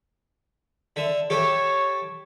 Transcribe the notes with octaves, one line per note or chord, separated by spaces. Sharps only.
D3 E5
G4 A4 C#5 E5